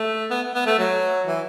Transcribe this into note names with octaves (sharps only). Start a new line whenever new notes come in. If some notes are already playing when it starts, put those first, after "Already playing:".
Already playing: A3
B3
B3
A3
F#3
E3